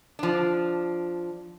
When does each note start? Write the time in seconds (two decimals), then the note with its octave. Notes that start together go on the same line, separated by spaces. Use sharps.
0.19 F3 D4